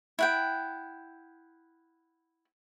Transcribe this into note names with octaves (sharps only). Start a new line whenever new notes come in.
E4 F#5 G5